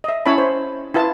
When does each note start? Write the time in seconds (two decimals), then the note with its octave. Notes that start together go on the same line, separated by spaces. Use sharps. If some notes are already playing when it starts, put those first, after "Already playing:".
0.04 D#5 E5
0.26 C#4 E4 C#5 A5 B5
0.38 C5
0.94 E4 F4 B4 A5